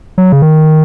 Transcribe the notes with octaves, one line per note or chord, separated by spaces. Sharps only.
F#3
C#3
D#3